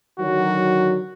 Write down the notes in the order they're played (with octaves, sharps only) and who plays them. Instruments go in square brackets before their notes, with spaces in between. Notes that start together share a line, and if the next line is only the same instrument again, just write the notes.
[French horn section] D3 D#3 F#3 [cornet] F#4